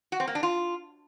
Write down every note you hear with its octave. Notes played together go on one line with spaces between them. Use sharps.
F#4
C4
A#3
D4
F4